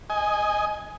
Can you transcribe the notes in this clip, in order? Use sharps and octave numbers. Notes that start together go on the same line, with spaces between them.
D#5 G#5